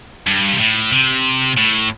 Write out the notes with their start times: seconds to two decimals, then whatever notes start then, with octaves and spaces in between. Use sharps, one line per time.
0.27 G2
0.53 C3
0.60 A2
0.92 C3
1.58 A2